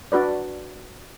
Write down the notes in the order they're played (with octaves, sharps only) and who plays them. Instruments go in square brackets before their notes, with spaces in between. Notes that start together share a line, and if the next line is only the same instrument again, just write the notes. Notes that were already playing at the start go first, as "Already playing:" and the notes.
[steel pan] D4 F#4 B4 D5